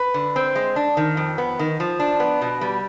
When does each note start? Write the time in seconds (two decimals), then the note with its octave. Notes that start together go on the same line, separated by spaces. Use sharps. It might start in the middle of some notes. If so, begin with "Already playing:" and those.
Already playing: B4
0.14 D3
0.36 C4
0.55 G#3
0.76 D4
0.97 D#3
1.17 F2
1.38 B3
1.59 D#3
1.80 F3
2.00 D4
2.20 B3
2.42 B2
2.61 G3